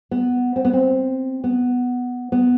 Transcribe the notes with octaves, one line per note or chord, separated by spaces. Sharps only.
B3
C4
B3
C4
B3
B3